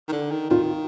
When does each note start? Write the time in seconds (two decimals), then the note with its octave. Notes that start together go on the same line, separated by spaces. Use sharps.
0.09 D#3
0.12 D3
0.31 D#3
0.50 D#3 F4